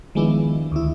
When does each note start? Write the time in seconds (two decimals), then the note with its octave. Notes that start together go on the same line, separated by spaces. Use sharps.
0.15 D#3 F3 G#3 B3 D4 E4
0.72 D2 D#3 E4